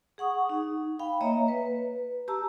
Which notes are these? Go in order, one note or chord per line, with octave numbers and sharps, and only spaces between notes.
G#4 F#5 C#6 D#6
D#4
F5 G5 B5
A#3 C#5 D#5 E5 A#5
B4
G4 A5 A#5 E6